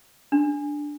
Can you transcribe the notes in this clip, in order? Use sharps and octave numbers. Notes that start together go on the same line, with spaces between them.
D4